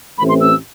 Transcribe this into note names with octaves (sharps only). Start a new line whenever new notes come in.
A1 A2 E3 A3 C4 B5
C6
E6